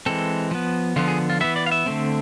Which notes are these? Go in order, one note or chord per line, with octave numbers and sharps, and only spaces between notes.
E3 G#3 C4 A4
F3 B3
D3 F3 B3 F4
G#4
F4
E3 B3 E5
D5
F5
E5
D3 A3 C4